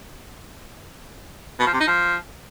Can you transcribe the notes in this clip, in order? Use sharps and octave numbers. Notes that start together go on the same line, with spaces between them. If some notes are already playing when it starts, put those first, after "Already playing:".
B2
F3
C3
D#4
F3